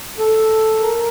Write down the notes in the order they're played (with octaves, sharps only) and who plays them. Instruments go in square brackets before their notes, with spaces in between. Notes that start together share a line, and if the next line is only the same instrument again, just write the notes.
[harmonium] A4
A#4
A#4